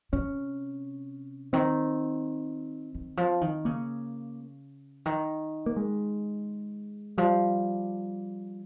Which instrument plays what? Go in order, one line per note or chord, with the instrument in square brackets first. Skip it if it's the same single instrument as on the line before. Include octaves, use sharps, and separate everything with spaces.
[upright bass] C3 [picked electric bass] C#4
[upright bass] D#3 [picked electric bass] C4
[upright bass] D#3
F3
D#3
[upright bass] C#3 [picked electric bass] A#3
[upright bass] D#3
[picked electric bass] A#3
G#3
[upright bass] F3 [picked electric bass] G3